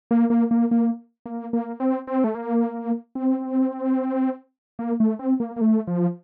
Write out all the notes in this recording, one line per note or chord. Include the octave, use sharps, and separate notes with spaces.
A#3
A#3
A#3
A#3
A#3
A#3
C4
C4
A3
A#3
C4
A#3
A3
C4
A#3
A#3
A3
F3